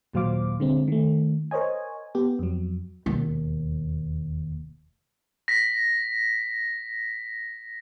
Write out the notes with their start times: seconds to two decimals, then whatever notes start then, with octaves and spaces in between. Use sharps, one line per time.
0.13 D#2 A#2 F#3 C5 F5 D6
0.60 D3 G#3 C4
0.88 D#3 A3
1.51 A#4 C5 C#5 D#5 G#5
2.15 B3 G4
2.39 F2 F#3
3.06 E1 D#2
5.48 A#6 B6